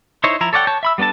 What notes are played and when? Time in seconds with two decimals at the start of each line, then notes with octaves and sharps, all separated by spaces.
0.24 D#4 E4 C5 C#5
0.41 F3 E4 A#5
0.53 A4 C#5 D5 F#5 G5
0.67 C#5 A5 G6
0.83 E5 B5 E6
0.98 G3 B3 D4 A4 A5